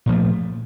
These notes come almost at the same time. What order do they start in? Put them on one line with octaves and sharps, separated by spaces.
A#2 F3 A3